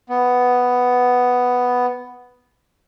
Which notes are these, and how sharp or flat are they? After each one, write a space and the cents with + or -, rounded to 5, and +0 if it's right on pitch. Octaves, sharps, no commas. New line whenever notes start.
B3 +5